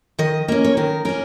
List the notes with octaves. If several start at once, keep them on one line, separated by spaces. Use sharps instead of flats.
D#3 D#5
A#3 C#4 A#4
C#5
D#3 A#4
A#3 C#4 A#4